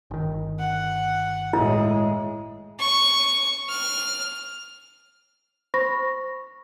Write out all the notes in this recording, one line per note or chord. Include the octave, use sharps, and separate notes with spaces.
G1 D#3
F#5
A2 G#3 E4
C#6
F6
C5 B5 C#6 A#6